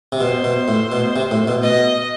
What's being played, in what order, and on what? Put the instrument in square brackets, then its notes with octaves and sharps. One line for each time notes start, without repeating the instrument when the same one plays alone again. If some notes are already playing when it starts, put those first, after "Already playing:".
[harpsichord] C3
[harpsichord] B2 [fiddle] C5
[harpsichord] B2
A2
B2
C3
A2
B2
[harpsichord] B2 [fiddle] D#5